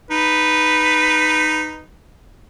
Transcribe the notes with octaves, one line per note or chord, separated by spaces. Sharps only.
D#4 B4